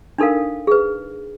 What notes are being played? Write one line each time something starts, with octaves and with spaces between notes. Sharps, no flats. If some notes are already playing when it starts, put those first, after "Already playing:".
D4 D#4 A4 A#4 F5
G#4 B4